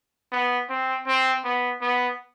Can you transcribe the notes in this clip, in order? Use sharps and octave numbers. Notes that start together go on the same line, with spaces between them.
B3
C4
C4
B3
B3